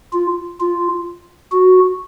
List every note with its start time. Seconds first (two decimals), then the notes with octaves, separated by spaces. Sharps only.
0.13 F4
0.60 F4
1.52 F#4